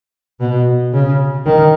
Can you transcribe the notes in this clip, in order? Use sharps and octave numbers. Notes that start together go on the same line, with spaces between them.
B2
C#3
D#3